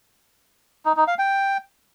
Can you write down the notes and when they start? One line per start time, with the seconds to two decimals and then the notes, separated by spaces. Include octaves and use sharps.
0.86 D#4
0.97 D#4
1.08 F5
1.19 G5